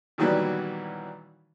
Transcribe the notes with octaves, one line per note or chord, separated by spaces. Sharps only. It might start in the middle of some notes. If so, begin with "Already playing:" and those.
A#2 D#3 E3 F#3 G3 B3